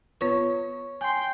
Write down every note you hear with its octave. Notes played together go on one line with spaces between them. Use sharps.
B3 F4 B4 C#5
G5 G#5 C6